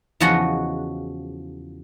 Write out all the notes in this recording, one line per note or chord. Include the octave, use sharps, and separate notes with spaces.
E2 C#3 F3 F#4 D#5 F#5